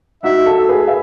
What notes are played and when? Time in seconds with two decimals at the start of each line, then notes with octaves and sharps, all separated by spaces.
0.23 D#4 F#4 E5
0.46 F#4 A4
0.69 G#4 B4
0.87 E5